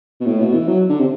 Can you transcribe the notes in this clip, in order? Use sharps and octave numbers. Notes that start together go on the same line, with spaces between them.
B2
A2
B2
E3
F#3
D3
C3